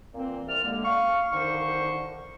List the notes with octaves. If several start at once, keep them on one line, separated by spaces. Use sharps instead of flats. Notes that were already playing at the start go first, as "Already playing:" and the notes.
A#2 E3 C4
C2 C3 D5 F6
D3 G#3 A#3
F5 C#6
C2 D3 D#3 D#4 C5 C#6